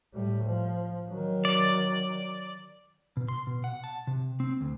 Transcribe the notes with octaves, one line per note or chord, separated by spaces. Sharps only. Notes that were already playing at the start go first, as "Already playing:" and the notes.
A2 G3
F3
D#3 F#3
D5
B2
C6
B2
F#5
A5
C3
C4
D2